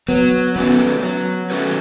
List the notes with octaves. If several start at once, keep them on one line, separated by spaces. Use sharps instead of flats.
F#3 B3
A3 B3 C#4 F#4 B4
F#3
A3 C#4 F#4 B4